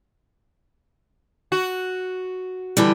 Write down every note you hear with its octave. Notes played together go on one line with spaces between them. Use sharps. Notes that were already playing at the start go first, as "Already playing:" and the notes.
F#4
D3 E3 G3